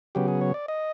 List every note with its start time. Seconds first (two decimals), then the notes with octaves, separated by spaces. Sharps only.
0.15 C#3 F#3 B3 G4
0.28 G#4
0.41 C#5
0.54 D5
0.68 D#5